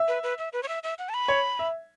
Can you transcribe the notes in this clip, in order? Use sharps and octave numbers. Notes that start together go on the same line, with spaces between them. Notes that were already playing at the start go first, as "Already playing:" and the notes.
Already playing: E5
B4
B4
E5
B4
C#5
E5
E5
F#5
A5
B5
C#5
E5